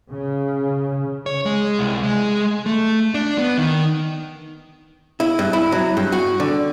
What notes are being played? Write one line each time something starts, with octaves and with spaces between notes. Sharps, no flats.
C#3
C#5
G#3
C2
G#3
A3
D4
B3
D#3
E4
G2
E4
F#3
G2
F#4
D3